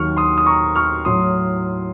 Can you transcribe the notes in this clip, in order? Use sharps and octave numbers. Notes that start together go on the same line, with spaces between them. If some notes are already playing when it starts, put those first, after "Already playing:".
Already playing: D#2 D#3 F#3 C#6 F6
C6 D#6
D#6
A#5 C#6
C#6 F6
A2 F#3 C6 D#6